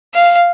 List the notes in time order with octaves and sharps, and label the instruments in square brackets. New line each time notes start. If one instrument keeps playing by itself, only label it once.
[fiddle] F5